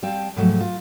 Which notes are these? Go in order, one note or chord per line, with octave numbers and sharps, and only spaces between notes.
G3 C4 F5 G5 A5
G#2 C3 F3 F#3 G#3 A3
F4